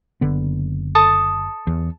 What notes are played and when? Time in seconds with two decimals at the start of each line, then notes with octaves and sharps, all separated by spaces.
0.21 F#1 D3 B3
0.95 A4 A5 D#6
1.67 E2